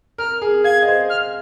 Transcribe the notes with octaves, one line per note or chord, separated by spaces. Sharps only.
A#4 F6
G#4
F5 G#6
D#5
C5
F6